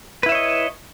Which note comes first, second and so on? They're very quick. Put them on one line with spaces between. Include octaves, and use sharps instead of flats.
B4 E4 E5 C#5 D#5